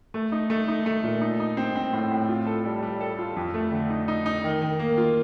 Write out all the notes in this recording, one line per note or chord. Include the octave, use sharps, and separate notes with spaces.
A3
D#4
A3
D#4
A3
A#2
D#4
D#4
C4
C4
A2
A2
F4
A4
G3
G3
A4
F4
F2
A3
D3
D#4
D#4
D#4
D#3
D#3
A#3
F4